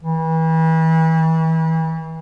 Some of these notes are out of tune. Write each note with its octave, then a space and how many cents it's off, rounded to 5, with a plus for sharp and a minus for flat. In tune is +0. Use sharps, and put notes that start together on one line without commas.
E3 -35